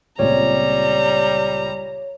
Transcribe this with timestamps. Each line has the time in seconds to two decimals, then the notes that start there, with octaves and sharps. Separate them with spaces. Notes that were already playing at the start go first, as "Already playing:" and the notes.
0.19 C#2 A#2 G3 C4 C#5 A#5